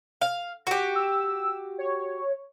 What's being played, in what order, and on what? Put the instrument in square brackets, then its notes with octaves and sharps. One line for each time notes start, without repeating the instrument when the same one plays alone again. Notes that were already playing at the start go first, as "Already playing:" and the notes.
[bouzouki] F5
F#4 G4
[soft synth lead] E6
C#5